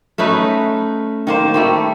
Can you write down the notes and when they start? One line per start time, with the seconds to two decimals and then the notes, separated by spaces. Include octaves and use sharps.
0.18 A3 C#4 D#4 B4
1.27 D#3 A#3 C5
1.54 D#3 G3 A3